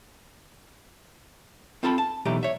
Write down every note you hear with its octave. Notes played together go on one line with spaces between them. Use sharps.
C4 F4 A4 A5 B5
A5
B1 E3 A3 G4 A#5
C#5 E5